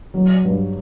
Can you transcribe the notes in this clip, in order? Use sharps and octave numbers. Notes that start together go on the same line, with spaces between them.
F#3
G2